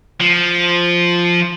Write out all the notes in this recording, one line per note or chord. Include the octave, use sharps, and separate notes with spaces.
F3